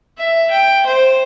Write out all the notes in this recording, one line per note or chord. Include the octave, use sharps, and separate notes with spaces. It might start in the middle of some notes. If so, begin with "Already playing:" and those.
E5
G5
C5